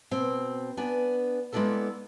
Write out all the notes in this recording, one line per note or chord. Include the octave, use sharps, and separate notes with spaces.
B2 C4
B3 D4 G#5
G#3 A#3 B3 D4 E4 A4